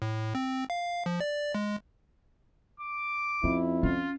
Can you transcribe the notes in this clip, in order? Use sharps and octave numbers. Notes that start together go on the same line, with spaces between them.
A2
C4
F5
F3
D5
G#3
D6
F2 C#4 E4
C#4 F4